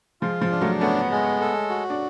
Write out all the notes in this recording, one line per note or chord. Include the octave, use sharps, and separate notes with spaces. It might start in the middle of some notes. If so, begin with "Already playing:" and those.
F3 G#3 F4
F3 G#3
D4
F#3 A3
A3 B3 C#4
G#3
A4
F#4
D4